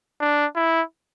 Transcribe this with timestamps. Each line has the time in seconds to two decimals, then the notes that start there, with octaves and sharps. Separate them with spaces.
0.21 D4
0.56 E4